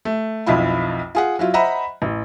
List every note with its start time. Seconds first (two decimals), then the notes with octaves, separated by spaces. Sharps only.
0.05 A3
0.46 B1 F2 E4 F4 B5
1.15 F4 G#4 F#5
1.39 F#3 E4 F4
1.54 C5 D#5 E5 F#5 A#5 B5
2.02 A1